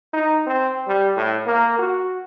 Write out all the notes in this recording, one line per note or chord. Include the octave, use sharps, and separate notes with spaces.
D#4
C4
G3
A2
A#3
F#4